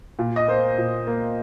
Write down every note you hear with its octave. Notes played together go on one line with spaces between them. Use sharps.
A#2
D#5
A#3 C5
A#2
A#3